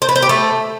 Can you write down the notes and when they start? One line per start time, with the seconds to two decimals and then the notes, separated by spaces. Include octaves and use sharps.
0.02 C5
0.09 B4
0.16 C5
0.22 G4
0.29 A3